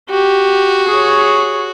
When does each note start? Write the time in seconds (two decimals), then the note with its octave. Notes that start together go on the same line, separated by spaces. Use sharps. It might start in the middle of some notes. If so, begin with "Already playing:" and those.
0.10 F#4 G4
0.88 G#4 C#5